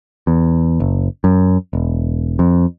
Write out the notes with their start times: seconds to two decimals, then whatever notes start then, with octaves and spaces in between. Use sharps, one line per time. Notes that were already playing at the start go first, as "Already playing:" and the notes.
0.27 E2
0.80 F#1
1.24 F#2
1.73 E1
2.39 F2